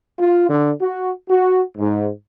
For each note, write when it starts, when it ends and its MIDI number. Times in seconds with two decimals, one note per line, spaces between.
0.19 0.47 65
0.48 0.71 50
0.80 1.11 66
1.28 1.61 66
1.78 2.08 44